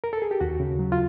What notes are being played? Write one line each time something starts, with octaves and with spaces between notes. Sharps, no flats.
A#4
A4
G#4
G4
D#2 F#4
C#3
F#3
F4